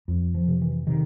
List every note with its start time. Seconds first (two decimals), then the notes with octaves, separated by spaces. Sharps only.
0.08 F2
0.35 F3
0.48 C3
0.62 E3
0.87 C3 D#3